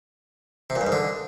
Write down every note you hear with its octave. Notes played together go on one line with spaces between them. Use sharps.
C3
A#2
G2
G#2
D3